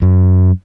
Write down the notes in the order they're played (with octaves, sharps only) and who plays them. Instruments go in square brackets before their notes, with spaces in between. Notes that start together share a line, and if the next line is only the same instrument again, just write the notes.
[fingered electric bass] F#2